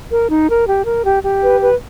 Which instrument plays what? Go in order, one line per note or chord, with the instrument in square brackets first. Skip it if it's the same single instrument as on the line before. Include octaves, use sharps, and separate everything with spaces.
[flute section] A#4
D#4
A#4
G4
A#4
G4
G4
B4
B4